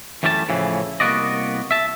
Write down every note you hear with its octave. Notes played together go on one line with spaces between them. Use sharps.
F#2 E3 G3 A3 C#5 A5
A2 C#3 E3 F3
C2 A#3 B3 F#4 D5 D#5
E5 A5